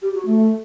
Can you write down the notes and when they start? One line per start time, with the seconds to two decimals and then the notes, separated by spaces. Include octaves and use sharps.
0.02 G4
0.14 F#4
0.26 A3